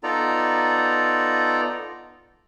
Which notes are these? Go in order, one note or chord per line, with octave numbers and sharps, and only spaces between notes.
B3 D#4 F4 A4 D5 A#5